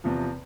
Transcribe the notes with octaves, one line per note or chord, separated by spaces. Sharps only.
E2 C3 F3